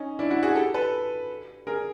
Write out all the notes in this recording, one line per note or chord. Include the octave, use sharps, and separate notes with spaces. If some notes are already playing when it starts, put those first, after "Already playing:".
Already playing: C#4 D#4
D4 E4
E4 F#4
F#4 G#4
G4 A4
A4 B4
G#4 A#4